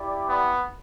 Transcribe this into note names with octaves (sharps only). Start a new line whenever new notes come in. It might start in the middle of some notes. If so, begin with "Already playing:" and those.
Already playing: E4 G4 D5
B3